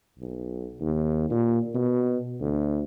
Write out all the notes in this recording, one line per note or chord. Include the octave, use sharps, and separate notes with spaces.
B1
D#2
A#2
B2
D2